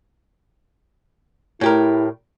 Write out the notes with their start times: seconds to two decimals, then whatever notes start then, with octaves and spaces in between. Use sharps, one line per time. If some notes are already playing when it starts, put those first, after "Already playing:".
1.61 A2 E4 G4 A#4